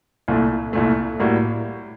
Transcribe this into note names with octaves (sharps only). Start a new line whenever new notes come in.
C2 A#2 A3
C2 A#2 A3
A2 G3 A#3 F#4